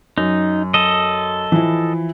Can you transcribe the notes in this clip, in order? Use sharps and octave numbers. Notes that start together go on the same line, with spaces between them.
F#2 D#4
A4 D#5
E3 F3 E4